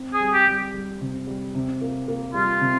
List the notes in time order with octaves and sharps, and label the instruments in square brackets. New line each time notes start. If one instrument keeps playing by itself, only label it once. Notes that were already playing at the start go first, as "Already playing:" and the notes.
Already playing: [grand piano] C4
[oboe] G#4
[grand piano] G3
[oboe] G4
[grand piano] G3
G3
C3
G3
C3
A#3
A#3
[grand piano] G3 [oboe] F4
[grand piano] C3